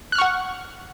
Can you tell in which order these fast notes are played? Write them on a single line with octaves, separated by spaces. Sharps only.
F#6 F6 C#6 F#5